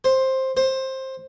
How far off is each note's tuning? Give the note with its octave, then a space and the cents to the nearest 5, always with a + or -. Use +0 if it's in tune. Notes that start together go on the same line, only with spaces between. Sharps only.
C5 +10
C5 +15